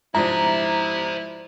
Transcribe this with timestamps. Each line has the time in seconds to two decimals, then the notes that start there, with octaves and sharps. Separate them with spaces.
0.15 G#2 F3 D4 E4 C5 E5 A#5